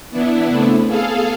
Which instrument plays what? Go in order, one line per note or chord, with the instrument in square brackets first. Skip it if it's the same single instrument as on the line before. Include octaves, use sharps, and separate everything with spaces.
[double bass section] E3 [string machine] B3 D4 E4
[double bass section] C#3 A3 C4
[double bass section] A3 B3 [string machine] G#4 A4 F5